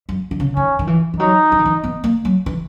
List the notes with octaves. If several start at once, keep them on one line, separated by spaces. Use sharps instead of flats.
F#2
D#3
C#3
D#3 C#4
D#3
E3
E3
F#3 D#4
E3
D#3
E3
B3
A#3
F#3
E3